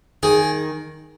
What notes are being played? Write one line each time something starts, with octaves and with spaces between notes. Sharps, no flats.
D#3 G#4